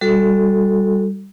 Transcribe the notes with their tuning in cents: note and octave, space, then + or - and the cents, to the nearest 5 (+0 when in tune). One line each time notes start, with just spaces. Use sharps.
G3 +0 F#4 -15 A4 +0